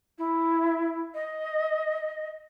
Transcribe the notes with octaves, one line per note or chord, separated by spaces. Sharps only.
E4
D#5